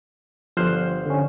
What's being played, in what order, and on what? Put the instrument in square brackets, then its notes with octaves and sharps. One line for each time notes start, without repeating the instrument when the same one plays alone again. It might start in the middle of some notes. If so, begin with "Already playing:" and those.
[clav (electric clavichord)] G1 C5 [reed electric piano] F3 F6 F#6
[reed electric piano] D3 C#4